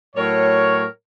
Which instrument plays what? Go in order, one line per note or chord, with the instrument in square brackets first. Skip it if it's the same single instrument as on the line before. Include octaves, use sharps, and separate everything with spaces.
[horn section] A2 F#3 A#4 C#5